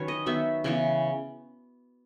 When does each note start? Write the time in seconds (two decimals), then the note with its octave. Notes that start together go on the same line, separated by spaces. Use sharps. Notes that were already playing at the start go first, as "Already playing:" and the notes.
Already playing: D#3 F#3 C#4 B4 C#5
0.08 D#5
0.26 D#3 F#3 B3 D#4 E5
0.64 C#3 E3 B3